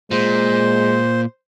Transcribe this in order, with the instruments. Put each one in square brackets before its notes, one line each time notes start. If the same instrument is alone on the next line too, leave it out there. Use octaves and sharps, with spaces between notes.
[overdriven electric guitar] A#2 [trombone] G#3 [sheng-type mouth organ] C5